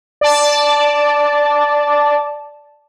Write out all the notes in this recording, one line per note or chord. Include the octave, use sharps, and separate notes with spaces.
D5 A5